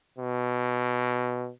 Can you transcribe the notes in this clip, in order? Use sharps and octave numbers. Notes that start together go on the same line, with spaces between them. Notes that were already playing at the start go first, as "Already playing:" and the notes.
B2